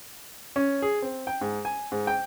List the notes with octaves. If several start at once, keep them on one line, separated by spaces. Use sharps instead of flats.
C#4
G#4
C4
G5
G#2
G#5
G#2
G5